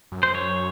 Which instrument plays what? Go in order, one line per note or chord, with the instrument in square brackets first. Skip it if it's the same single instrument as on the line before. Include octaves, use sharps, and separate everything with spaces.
[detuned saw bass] F#2
[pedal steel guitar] C5
C#5